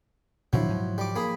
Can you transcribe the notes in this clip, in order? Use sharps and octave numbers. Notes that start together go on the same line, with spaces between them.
A#2 D#3 F3 F#3 D4 E4
G#2
G3 D6
A#3 G#4 B5